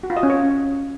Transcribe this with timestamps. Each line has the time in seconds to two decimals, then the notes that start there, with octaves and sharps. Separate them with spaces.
0.03 F#4
0.10 F4
0.17 D#5
0.23 C#4
0.30 C#5